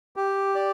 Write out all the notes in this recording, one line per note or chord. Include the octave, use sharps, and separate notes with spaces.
G4
D5